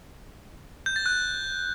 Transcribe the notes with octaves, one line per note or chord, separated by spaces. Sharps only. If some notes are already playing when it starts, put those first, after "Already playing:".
G6
A6
F#6